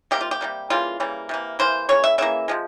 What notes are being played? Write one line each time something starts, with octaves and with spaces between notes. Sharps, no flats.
C3 G3 A#3 G4
F4
G4
C3 G3 A#3
C#3 E3 G3 A#3 F4
C#3 E3 G3 A#3
C3 E3 A#3
C3 E3 A#3 C5
C#3 E3 A#3 C#5
E5
C#3 E3 A#3 E5
C3 F3 G#3